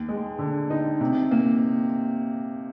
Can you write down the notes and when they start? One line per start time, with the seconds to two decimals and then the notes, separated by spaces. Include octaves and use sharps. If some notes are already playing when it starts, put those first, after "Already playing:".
Already playing: D#2
0.09 G#3
0.39 D3
0.70 D#4
1.01 C3
1.31 A#3